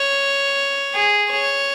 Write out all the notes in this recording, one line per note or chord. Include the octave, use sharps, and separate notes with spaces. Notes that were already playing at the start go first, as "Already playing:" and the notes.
Already playing: C#5
G#4
C#5